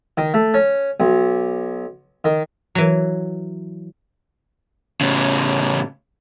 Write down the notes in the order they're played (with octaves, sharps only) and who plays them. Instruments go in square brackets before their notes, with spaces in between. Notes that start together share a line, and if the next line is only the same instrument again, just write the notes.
[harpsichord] D#3
A3
C#4
B1
D#3
[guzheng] E3 F#3
[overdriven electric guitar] A2 C#3